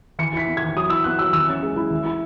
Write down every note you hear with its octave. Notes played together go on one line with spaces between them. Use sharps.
E3 C#7
E4 B6
B3
G#6
E3
F#3 D#6
E4 E6
B3 F#6
F#3 E6
E3 E6
C#4
G#3
E4
E3
E4